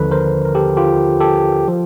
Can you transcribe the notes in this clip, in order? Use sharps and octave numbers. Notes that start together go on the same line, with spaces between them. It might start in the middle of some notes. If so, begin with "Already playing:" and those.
Already playing: D#2 D3 F3 A4 B4
A#4 C5
A#4
G4 A4
F4 G4
G4 A4
F3